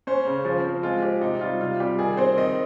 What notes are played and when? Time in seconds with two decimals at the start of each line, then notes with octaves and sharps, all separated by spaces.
0.07 C#4 C5
0.27 C#3
0.45 F3 C5
0.65 C4
0.83 G#3 F4
1.02 C4 G4
1.21 C3 D#4
1.41 G3 F4
1.61 C3 F4
1.80 G3 G4
1.98 D#3 G#4
2.17 C4 C5
2.37 D#3 D#5